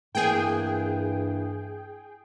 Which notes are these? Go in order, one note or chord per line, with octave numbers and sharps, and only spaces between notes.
G2 E3 A#3 C4 G#4 G5